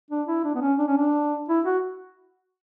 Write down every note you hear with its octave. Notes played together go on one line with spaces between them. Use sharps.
D4
E4
D4
B3
C#4
D4
C#4
D4
E4
F#4